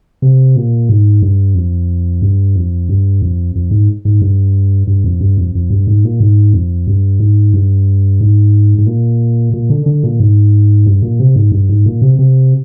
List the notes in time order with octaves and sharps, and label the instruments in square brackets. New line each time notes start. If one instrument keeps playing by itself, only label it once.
[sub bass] C3
A#2
G#2
G2
F2
G2
F2
G2
F2
F2
G#2
G#2
G2
G2
F2
G2
F2
F2
G2
G#2
A#2
G#2
F2
G2
G#2
G2
G#2
G#2
A#2
A#2
D3
D3
A#2
G#2
G2
A#2
C3
G#2
G2
G#2
A#2
C3
C3